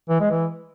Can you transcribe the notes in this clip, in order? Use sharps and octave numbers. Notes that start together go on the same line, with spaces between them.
E3
G#3
E3